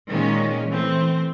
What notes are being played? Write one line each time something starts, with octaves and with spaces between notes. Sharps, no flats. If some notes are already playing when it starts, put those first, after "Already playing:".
A#2 D#3 G#3 C#4
E3 A3 C4